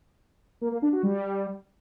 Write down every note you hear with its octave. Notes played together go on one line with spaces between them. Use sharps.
A#3
A#3
D4
F#4
G3